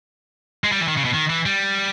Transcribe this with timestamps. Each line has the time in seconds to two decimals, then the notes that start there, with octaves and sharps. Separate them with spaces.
0.64 G#3
0.72 G3
0.80 E3
0.88 D#3
0.97 C#3
1.05 B2
1.13 D#3
1.29 E3
1.46 G3